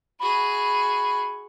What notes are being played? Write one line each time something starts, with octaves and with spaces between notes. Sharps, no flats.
F#4 G#4 B5